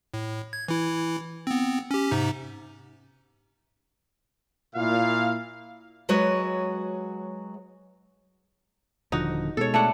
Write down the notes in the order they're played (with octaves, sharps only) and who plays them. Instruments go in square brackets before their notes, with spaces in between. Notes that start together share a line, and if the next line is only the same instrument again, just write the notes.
[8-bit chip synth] A2
G#6
E3 E4
B3 C4
C#4 G4
G#2 C3 D#4
[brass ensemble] A#2 E4 F5
[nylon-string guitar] F#3 G#3 F#4 B4 C#5
[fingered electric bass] D#1 D3 F3 [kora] D#4 F#4
[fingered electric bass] B2 G#3 [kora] A4 C#5
[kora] A3 D4 F#5